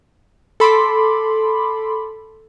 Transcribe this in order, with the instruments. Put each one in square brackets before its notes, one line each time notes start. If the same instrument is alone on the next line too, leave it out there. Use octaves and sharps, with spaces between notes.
[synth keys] A4 B5 C6 D6